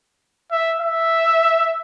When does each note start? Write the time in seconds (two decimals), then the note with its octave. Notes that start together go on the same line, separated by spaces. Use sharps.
0.52 E5
0.81 E5